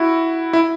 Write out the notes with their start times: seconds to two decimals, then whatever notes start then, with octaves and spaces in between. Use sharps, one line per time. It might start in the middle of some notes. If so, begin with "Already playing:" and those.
Already playing: E4 F#4
0.53 E4